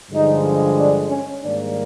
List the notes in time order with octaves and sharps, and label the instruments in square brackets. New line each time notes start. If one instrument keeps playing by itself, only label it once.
[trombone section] G2 D3 F3 G#3 D#4
D4
C#4
G#2 D#3 G3 A#3 D4